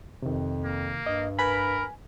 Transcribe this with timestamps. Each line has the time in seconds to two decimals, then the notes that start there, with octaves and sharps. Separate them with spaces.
0.22 F2 C3 D#3
0.64 A#3
1.06 G2 D#5
1.39 A#4 B4 G#5 B5